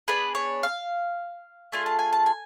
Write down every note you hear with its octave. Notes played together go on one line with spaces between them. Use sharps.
B3 D4 G#4 B4
C#5
F5
A3 D4 F4 G#4 G#5
A5
G#5
A5
G#5